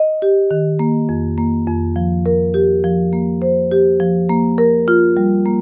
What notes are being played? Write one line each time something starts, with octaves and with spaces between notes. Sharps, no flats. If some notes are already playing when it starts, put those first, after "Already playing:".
Already playing: D#5
G4
D#3
A#3
F2
A#3
F2
F3
A#4
G4
F3
A#3
C5
G4
F3
A#3
A#4
F4
G3
A#3